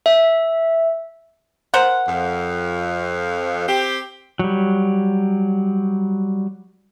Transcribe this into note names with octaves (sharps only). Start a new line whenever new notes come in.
E5
A#4 C5 F#5
F2
C4 G4
F#3 G3